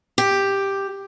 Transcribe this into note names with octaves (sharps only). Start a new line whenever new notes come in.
G4